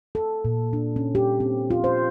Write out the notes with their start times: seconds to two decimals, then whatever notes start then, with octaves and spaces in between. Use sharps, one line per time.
0.15 A4
0.45 A#2
0.73 D4
0.96 C#4
1.15 G4
1.40 C4
1.71 F4
1.84 C5